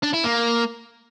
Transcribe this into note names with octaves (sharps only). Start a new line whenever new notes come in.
D4
E4
A#3